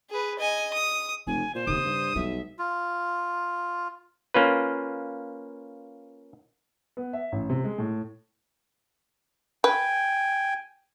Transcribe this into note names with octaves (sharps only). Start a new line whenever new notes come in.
G#4 B4
D#5 G#5
D#6
F1 C#3 G#5
A#2 C5
D#2 C#3 C4 D#6
G2
B1 G3 G#3 E5
F4
A#3 C#4 F4 B4
B3
E5
A1
C3
G#3
A2
B4 G5 G#5